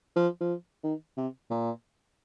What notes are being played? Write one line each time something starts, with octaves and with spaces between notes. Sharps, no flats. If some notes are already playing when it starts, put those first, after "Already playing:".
F3
F3
D#3
C3
A#2